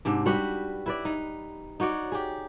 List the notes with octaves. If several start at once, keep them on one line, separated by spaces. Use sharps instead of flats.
G#2 C3 D4
G3 F#4 B4 F#5
E4 B4 D5
D#4
D#4 F#4 C#5 D5
G4 G#4